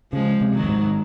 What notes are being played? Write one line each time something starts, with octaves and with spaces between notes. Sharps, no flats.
C#3 F3 G#3
C3
D#3 F#3
F#2
G#2